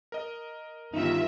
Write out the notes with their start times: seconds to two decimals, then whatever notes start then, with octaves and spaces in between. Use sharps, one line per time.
0.12 A#4 D#5
0.94 G1 D#3 D#4 F4 E5